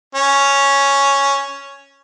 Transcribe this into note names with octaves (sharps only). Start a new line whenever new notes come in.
C#4